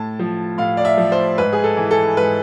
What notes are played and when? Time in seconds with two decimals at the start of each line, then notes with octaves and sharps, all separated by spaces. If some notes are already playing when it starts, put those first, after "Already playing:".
Already playing: A2 A5
0.19 F3
0.58 A2 F5
0.77 D5
0.85 E5
0.98 F3
1.12 C5
1.38 G#2 B4
1.53 G#4
1.64 A4
1.77 E3
1.91 A4
2.17 G#2 B4